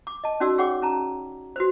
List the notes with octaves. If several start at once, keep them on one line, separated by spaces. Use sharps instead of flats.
D6
D#5 A5
C#4 D#4 F#4 D5 E6
G#4 C#5 F#5 G5 D6
C#4 A5 A#5
F#4 B4 C5